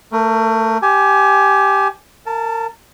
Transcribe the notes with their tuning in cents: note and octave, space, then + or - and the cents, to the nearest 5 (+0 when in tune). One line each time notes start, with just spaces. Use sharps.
A3 +25 A#4 +0
G4 +0 G#5 +20
A#4 -30 A5 +0